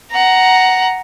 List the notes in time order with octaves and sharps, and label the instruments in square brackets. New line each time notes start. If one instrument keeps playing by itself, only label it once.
[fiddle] F#5 A#5